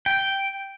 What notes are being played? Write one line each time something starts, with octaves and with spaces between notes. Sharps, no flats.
G5